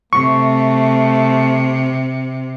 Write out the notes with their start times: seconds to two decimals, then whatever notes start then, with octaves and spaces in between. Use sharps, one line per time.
0.13 C3 A3 C#6